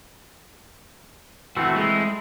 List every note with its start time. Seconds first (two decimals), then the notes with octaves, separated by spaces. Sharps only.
1.57 E3 A3 C4 F#4
1.76 G#3